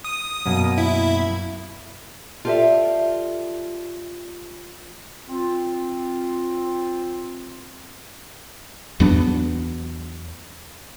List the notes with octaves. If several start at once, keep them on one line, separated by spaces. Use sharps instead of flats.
D#6
F#2 B2 A#3
E4
F4 G4 A4 C#5 D5 E5
C4 F4
E2 F#3 B3 D4